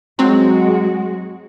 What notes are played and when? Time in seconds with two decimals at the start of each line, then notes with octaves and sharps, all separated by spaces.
0.19 F#3 G#3 C4 F#4